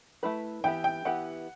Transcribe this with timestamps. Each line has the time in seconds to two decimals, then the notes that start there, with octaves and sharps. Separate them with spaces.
0.23 A3 E4 B4
0.64 E3 B3 E4 G4 G5
0.84 G5
1.05 E3 B3 E4 G4 F#5